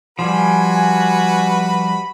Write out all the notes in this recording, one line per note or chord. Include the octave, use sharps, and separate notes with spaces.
F3 G3 F#4 B4 G#5 B5